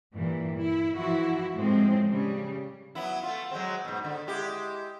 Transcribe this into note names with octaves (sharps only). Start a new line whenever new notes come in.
G2 A#2 E3 G3
E4
E3 F3 E4 F#4
A2 F3 G#3 C4
C#3 G3
F#3 B3 E4
A3 F4
F#3 G#3 C4
G#2 B2
D3
G#3 E4 G4